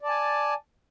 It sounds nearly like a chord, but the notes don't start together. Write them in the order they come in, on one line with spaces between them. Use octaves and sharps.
D5 A5 G#5